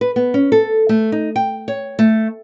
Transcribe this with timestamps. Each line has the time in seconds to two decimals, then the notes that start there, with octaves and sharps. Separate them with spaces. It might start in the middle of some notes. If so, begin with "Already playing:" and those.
0.01 B4
0.16 B3
0.34 C#4
0.52 A4
0.89 A3
1.12 D#4
1.36 G5
1.68 C#5
1.99 A3